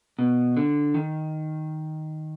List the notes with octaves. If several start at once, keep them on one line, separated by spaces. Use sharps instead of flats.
B2
D3
D#3